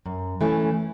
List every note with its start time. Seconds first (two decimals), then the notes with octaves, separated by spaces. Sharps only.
0.06 F#2
0.41 E3 A3 C#4